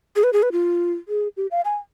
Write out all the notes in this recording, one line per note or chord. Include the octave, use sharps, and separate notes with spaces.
G#4
B4
G#4
B4
F4
G#4
G4
F5
G#5